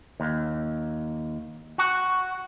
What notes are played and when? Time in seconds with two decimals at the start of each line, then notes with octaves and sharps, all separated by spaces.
0.20 D#2
1.78 F#4